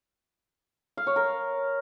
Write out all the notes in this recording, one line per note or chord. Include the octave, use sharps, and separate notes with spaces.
F5
C#5
A#4